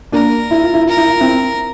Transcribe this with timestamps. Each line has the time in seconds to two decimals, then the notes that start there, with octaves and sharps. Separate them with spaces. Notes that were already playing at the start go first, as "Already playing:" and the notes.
0.12 A#3 D4 A#4
0.51 E4
0.62 F4
0.74 E4
0.85 F4 A#4
0.97 E4
1.08 F4
1.20 C4 E4